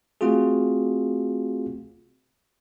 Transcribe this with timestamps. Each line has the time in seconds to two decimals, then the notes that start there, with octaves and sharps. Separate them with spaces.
0.21 A3 C4 F4 F#4 G#4